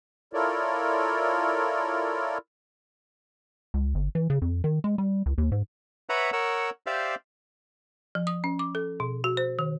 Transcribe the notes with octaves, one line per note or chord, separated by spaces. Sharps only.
E4 F4 A4 A#4 C#5 D5
C#2
G1
E3
C#3
F2
D#3
G#3
G3
C#2
D#2
G#2
B4 C#5 E5 F#5 A#5 B5
A#4 C#5 F#5 E6
G4 C5 D5 E5 F5
F3
D#6
C#4
D6
A4
B2
F#4
C5
D#3